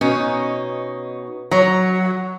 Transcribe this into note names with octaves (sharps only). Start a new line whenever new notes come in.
B2 C#4 D#4
F#3 C#5 A#5